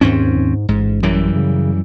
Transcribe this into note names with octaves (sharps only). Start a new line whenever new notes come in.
D#2 G#2 C4 C#4
G#2
A1 G#2
F#2 E3 G3
C#3